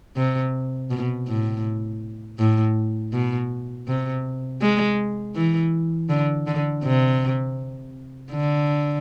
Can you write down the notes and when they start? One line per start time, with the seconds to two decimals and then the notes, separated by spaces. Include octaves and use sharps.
0.17 C3
0.91 B2
1.28 A2
2.39 A2
3.13 B2
3.87 C3
4.62 G#3
5.36 E3
6.09 D3
6.47 D3
6.84 C3
8.31 D3